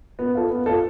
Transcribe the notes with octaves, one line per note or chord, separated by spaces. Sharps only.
B3
F4 A4
B3
F4 A4